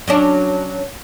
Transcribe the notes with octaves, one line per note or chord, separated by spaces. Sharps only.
F#3 C#4 D4